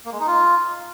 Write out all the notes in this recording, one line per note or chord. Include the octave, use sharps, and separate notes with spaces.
A#3
G#3
D#4
F4